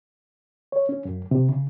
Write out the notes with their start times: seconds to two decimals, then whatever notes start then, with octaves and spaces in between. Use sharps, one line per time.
0.72 C#5
0.89 C#4
1.05 F#2
1.31 C3
1.49 C#3